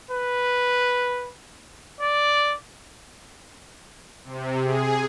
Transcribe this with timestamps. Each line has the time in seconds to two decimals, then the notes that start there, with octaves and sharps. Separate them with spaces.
0.11 B4
2.01 D5
4.24 C3
4.62 G#4